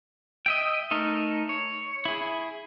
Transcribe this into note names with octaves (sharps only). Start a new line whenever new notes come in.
D#5 E5 G5
A3 D#4 A4 A#4
C#5
E4 G#4